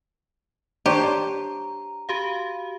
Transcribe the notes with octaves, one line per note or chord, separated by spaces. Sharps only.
D4 G4 C5 C#5 A#5
F#4 G4 F5